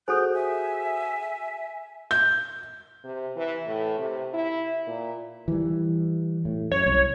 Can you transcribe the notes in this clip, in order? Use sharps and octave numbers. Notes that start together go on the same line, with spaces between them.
F#4 G#4 A4 C5 G6
E5 G#5
G6
C3
E3
A2
C3
E4
A#2
E3 G3
A2
F#2 C#5
C2